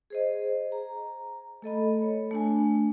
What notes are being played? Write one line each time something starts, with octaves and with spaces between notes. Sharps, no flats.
G#4 C5 D#5
A#5
A3 A4 D#5 B5
C#5
A3 D4 G#5